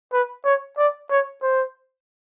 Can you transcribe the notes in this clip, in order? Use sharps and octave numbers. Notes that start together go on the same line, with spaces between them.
B4
C#5
D5
C#5
C5